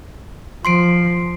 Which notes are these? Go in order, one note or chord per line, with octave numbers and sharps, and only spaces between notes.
F3 C6 C7 D7